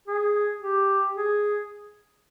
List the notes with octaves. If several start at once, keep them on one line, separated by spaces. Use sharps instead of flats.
G#4
G4
G#4